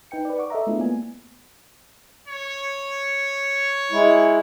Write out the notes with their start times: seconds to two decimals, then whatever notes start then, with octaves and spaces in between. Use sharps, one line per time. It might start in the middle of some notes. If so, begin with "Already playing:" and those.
0.11 D#4 B4 G5 C#7
0.25 B4 D5
0.38 F#5 C#6 D6
0.50 A4 D#5 E5 A#5
0.67 G#3 A3 B3 D4 E4 F4
0.78 A#3 B3 G#5
2.28 C#5
3.91 G#3 E4